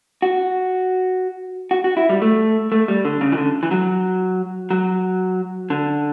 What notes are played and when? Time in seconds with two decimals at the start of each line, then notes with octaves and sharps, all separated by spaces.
0.22 F#4
1.71 F#4
1.84 F#4
1.97 E4
2.09 G3
2.22 A3
2.72 A3
2.88 G3
3.05 D3
3.21 C#3
3.32 E3
3.37 D3
3.63 E3
3.71 F#3
4.71 F#3
5.70 D3